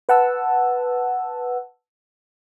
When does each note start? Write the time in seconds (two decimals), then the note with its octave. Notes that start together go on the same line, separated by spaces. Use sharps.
0.09 B4 F#5 A5 E6